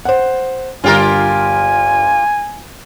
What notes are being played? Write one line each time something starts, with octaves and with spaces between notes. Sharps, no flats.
C5 F#5
G1 F4 G4 A#4 G#5